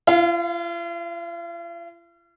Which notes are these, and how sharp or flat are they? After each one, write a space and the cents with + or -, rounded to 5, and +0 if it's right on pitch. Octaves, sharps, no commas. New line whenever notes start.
F4 -45 F5 +0